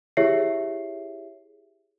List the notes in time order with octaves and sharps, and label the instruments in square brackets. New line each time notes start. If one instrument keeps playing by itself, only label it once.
[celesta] E4 G4 G#4 C#5 E5 C7